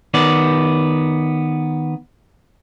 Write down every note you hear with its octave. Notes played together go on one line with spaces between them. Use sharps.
D#3 B3 D5